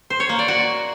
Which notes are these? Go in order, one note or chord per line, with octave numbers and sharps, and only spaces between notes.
C5
C#5
A#3
D5
F#4